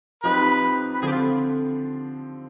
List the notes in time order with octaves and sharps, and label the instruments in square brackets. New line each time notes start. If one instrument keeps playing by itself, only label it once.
[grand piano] F3 C4 D#4 G4 [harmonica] B4
[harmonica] B4
[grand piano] D3 F3 C4 [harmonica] G4 G#4
[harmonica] F4